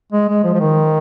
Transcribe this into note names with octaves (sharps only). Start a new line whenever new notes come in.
G#3
G#3
F3
F3
D#3